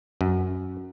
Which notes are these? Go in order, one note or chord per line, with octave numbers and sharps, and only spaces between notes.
F#2